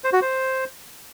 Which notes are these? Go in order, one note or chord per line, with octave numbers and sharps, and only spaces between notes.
C5
F#4
C5